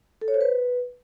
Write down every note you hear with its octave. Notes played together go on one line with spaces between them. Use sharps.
A4
C#5
C5
B4